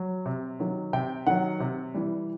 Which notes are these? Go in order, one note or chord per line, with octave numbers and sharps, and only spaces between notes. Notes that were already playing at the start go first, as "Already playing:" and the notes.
Already playing: F#3
C3
D#3 F#3
C3 G5
D#3 F#3 F#5
C3
E3 G3